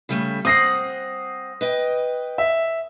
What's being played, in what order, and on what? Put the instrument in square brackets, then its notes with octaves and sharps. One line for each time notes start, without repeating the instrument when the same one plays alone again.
[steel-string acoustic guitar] C#3 G3 A3
[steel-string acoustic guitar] C4 F#5 [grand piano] D#6 A#6 C7
[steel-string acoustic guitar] B4 D#5 G5
[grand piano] E5